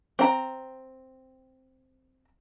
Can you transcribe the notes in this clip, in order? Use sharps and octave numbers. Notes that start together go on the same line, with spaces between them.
C4 A#5